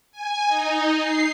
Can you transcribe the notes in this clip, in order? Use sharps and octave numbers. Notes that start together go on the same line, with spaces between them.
G#5
D#4
C7